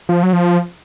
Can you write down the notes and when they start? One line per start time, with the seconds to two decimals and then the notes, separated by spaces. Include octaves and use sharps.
0.09 F3
0.23 F#3
0.33 F3